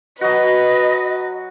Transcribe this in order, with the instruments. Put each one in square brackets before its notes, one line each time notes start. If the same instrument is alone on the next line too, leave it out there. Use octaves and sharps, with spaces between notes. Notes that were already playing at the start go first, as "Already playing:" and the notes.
[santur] F#3 F#4 [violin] B4 [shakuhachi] D#5